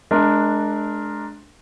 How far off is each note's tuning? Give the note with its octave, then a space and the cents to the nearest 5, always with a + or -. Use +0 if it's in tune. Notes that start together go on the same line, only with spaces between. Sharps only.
G#3 +30 D4 +0 A#4 +0